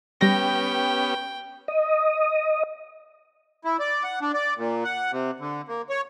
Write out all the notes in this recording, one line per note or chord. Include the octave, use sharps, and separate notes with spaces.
G3 B3 C#4 G4 G5 A#6
D#5
E4
D5
F#5
D4
D5
A#2
F#5
C3
D3
A#3
C#5